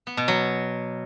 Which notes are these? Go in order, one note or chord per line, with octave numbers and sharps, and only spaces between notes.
B3
B2
F#3